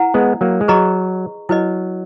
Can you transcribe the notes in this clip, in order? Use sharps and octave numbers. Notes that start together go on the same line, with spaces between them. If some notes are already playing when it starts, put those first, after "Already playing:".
Already playing: E4 B4 F#5 A#5
G#3 B3
F#3 A#3
G#3
F#3 G#4 B4 D#5 A#5 C#6
F#3 E4 B4 D#5